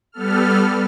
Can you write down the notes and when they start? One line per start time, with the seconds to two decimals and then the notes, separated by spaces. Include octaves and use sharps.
0.12 G3 B3 A4 F6